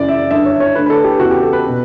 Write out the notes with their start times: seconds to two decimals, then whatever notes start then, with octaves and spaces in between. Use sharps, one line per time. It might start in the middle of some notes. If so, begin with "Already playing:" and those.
Already playing: F#2 C#3 E3 D5
0.09 E5
0.31 G2 D3 E5
0.45 C#5
0.60 C#5
0.75 D3 B4
0.79 D2
0.86 B4
0.90 A4
1.04 G4
1.20 E2 C#3 E3 F#4
1.31 G4
1.42 A4
1.53 B4
1.68 B2